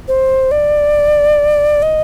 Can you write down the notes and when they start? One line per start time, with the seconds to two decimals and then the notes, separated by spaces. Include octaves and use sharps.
0.08 C5
0.51 D5
1.82 D#5